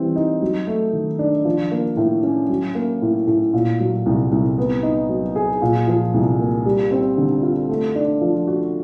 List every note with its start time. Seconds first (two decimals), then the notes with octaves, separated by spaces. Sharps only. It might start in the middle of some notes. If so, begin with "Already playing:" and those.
Already playing: E3 G3 C4
0.16 D#4
0.42 F#3
0.67 A3
0.93 D#3
1.19 D4
1.45 F3
1.71 A#3
1.97 A2
2.23 C#4
2.49 F#3
2.75 A#3
3.02 A2
3.27 A2
3.54 A#2
3.80 F#3
4.06 C2
4.32 C2
4.58 B3
4.83 D#4
5.09 F#3
5.36 G#4
5.62 A#2
5.88 F3
6.14 C2
6.40 A#3
6.66 G3
6.91 C4
7.18 D3
7.43 F4
7.69 A3
7.95 D4
8.21 F3
8.47 F#4